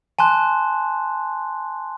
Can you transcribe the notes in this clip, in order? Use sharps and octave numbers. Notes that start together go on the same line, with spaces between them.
G#5 A5 C6 F#6